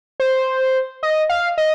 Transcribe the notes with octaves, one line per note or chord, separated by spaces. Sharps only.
C5
D#5
F5
D#5